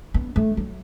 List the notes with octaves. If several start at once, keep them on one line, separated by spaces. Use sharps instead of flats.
B3
A3
F#3